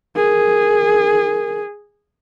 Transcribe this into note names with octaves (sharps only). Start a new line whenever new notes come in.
G#4 A#4